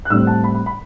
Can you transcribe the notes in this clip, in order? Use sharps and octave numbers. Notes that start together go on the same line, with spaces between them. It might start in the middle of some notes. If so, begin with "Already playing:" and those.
F#6
A2 G3 C4 E6
A5
B5
B5
B5